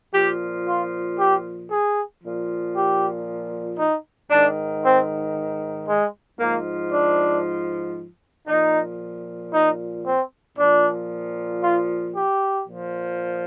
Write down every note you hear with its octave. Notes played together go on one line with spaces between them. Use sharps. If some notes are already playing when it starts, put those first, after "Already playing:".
A#2 F3 G4
F4
G4
G#4
A#2 F3
G4
D#4
G#2 D#3 D4
C4
G#3
G#2 F3 A#3
D4
A#2 F3 D#4
D#4
C4
A#2 F3 D4
F4
G4
A#2 F3